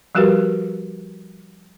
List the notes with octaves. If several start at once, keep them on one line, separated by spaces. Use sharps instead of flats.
F3 G3 F#4 G4 A#4 B4